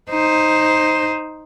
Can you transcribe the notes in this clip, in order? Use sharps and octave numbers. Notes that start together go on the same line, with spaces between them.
D#4 C5